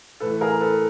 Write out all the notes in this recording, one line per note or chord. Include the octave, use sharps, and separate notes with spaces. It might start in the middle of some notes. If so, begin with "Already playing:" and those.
A2 E3 A4 B4
G#4 A#4
A4 B4